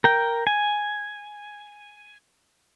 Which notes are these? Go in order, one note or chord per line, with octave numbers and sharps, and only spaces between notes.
A#4 G5
G#5